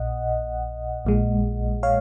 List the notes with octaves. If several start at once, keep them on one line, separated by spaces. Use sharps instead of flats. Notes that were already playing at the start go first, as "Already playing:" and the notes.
Already playing: A#1 A#2 D#5 F#5
A#1 A#2 G#3
C#5 F5